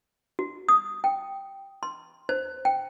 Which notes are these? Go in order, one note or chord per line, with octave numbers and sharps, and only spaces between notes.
F#4
D#6
G5
C6
C5
G5